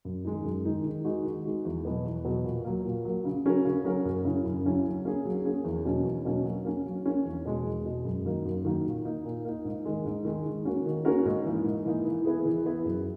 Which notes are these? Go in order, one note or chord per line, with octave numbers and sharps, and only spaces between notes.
F#2
D#3 G#3 D#4
F#2
D#3 G#3 D#4
D#3
G#3 D#4 F#4
D#3
G#3 D#4 F#4
E2
B2 F#3 B3
E2
B2 F#3 B3
A#2
F#3 A#3
A#2
F#3 A#3
C#3
F#3 C#4 F#4 A#4
C#3
F#3 C#4 F#4 A#4
F#2
C#3 F#3 C#4 E4
F#2
C#3 F#3 C#4 E4
F#3
A#3 C#4 G#4
F#3
A#3 C#4 G#4
E2
B2 F#3 A#3 C#4
E2
B2 F#3 A#3 C#4
F#3
A#3 C#4
F#3
A#3 C#4
E2
B2 G#3
E2
B2 G#3
F#2
D#3 F#3 A#3 D#4
F#2
D#3 F#3 A#3 D#4
A#2
A#3 D#4
A#2
A#3 D#4
G#2
D#3 G#3
G#2
D#3 G#3
D#3
A#3 C#4 F#4 A#4
D#3
A#3 C#4 F#4 A#4
G#2
E3 A#3 D#4
G#2
E3 A#3 D#4
E3
B3 E4 G#4
E3
B3 E4 G#4
F#2